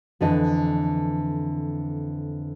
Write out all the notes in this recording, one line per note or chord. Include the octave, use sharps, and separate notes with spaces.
F2 D3 E3 D#5